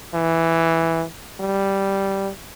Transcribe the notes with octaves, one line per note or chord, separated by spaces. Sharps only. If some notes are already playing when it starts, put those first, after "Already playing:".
E3
G3